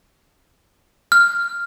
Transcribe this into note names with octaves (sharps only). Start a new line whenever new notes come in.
F6